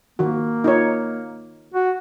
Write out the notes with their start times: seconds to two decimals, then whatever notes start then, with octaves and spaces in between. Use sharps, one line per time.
0.19 D#3 F3 A#3 F#4
0.64 D#4 F4 C#5
1.74 F#4